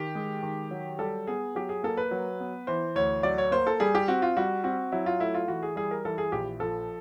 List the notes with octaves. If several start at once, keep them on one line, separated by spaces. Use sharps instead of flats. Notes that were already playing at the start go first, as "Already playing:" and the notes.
Already playing: D#3 G4
G#3
D#3
F#3
G3 A4
B3 G#4
F#3 G4
G#4
A#3 A4
B4
F#3
B3
E3 C5
D2 C#5
F#3 D5
C#5
A#3 C5
A4
G3 G#4
G4
C4 F#4
F4
G3 F#4
C4 F#4
F#3 E4
F4
A3 E4
F4
E3 F#4
G#4
G3 G#4
A#4
E3 A4
G#4
A#1 G4
F3 A4